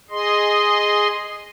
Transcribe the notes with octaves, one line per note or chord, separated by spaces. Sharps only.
G#4 D#5 C6